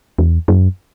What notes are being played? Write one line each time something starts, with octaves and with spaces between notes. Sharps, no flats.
E2
F#2